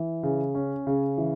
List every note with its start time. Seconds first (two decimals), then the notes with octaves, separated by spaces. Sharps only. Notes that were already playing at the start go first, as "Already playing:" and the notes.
Already playing: E3
0.23 C#3
0.55 C#4
0.87 C#3
1.18 E3